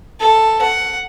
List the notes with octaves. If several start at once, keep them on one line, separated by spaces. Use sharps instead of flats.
A4
F#5